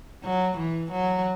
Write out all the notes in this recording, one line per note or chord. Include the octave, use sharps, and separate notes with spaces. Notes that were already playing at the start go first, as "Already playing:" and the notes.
F#3
E3
F#3